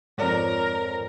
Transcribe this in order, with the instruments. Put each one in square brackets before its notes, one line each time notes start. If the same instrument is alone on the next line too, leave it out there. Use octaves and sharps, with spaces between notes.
[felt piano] F2 C#5 [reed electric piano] G#2 D5 [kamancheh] A#4